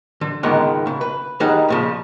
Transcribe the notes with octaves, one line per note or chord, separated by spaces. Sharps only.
D3
C#2 G#2 D#3 G#3 B3
C#3
B4
D#3 G3 D#4 G#4 F#5
A#2 C#3 F3